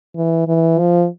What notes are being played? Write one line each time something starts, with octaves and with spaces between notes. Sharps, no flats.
E3
E3
F3